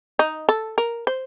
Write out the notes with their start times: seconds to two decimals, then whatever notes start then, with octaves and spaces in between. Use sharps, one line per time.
0.19 D#4
0.49 A4
0.78 A#4
1.07 C5